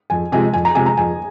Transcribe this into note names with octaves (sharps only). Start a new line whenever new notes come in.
F2 G#5
C3 F3 G#3 G#5
F2 G#5
A#5
C3 F3 G#3 G#5
A#5
F2 G#5